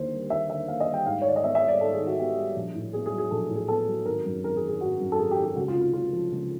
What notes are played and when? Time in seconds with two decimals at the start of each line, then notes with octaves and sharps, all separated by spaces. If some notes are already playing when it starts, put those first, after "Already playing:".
Already playing: D#2 D3 A#3 C5
0.11 G3
0.30 D#2 E5
0.50 D3 E5
0.68 A#3 F5
0.80 D#5
0.87 G3
0.93 G5
1.06 G#2 F5
1.22 C#5
1.24 D#3 D5
1.36 D#5
1.43 B3 E5
1.55 E5
1.62 G3
1.68 D5
1.81 G#2 A4
1.93 G#4
2.00 D#3
2.06 F#4
2.18 B3 G4
2.37 G3
2.56 A#1
2.75 A2
2.93 B3 G#4
3.06 G#4
3.12 F#3
3.18 G#4
3.31 A#1 A4
3.49 A2
3.56 G#4
3.68 B3 A4
3.88 F#3
4.05 G#1 A#4
4.25 F#2
4.43 G#1 A#4
4.56 G#4
4.62 D#3
4.68 G#4
4.81 G#1 F#4
5.00 F#2
5.12 A4
5.18 G#1 G#4
5.31 G4
5.37 D#3
5.44 G4
5.56 C#2 F#4
5.68 F4
5.75 C3
5.81 F4
5.93 C#2 F4
6.13 F3
6.32 C#2